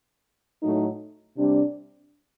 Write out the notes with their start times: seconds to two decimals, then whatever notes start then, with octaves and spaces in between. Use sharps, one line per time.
0.62 A2 F#3 A3 D#4
1.36 C3 G3 D4